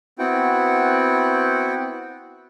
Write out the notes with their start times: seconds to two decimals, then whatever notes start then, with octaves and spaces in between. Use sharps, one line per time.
0.19 B3 C4 E4 F#4 F#5 G5